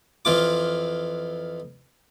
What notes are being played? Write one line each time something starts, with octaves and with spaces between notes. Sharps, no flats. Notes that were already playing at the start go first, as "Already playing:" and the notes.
F2 E3 F4 D6